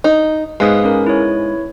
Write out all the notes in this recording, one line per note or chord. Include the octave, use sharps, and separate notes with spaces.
D#4
G#2 G#3 B3 F5 D#6
C#4 A#4
E4 C#5